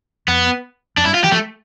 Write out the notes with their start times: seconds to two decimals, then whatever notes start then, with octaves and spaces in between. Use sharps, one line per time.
0.28 F2 B3
0.97 F2 D4
1.05 G2 E4
1.14 F4
1.24 E3 G4
1.32 F3 A3